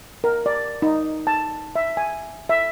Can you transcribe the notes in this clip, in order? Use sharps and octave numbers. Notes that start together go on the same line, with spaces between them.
A#4
D5
D#4
A5
E5
G#5
E5